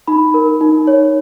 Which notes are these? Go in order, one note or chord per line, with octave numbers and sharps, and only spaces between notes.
D#4 B5
A#4
D#4
C#5